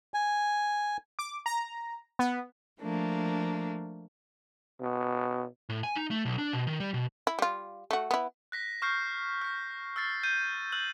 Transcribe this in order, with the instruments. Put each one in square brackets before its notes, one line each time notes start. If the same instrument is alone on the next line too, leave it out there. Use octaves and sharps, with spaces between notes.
[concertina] G#5
[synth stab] D6
A#5
B3
[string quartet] F3 A3 A#3 D4
[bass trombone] B2
[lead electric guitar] A2
G#5
D#4
A3
B1
D4
B2
D#3
G3
B2
[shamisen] E4
G3 F4
A3 F#4
B3 E4
[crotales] F#6 A#6 B6
C#6 F6 G6 C7
F6 A#6
E6 F6 A6 C7
G6 D#7
E6 F#6 G6 F#7